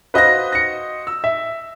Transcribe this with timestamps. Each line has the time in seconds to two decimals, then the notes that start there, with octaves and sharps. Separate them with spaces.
0.14 F#4 B4 C5 D#5 F5 A#6
0.52 A#6 C#7
1.07 E6
1.24 E5